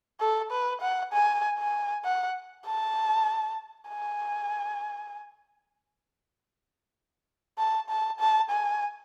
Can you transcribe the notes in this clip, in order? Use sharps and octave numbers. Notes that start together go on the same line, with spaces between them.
A4
B4
F#5
G#5
G#5
F#5
A5
G#5
A5
A5
A5
G#5